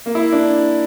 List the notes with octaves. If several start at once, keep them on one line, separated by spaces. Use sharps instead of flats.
A#3
E4
D4